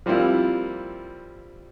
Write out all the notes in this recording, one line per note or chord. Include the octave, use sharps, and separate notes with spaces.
F3 G3 A#3 C4 E4 F4